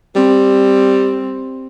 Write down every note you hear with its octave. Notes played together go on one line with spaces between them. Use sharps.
G3 C4